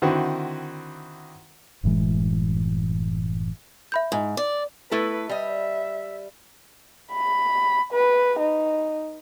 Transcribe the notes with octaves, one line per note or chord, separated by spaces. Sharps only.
D3 D#3 C4 E4 F#4
F#1 A2 E3 G#3
E5 B5 G6
G#2
D5
A3 E4 A4 B4
G3 D#5 E5
B5
B4
D#4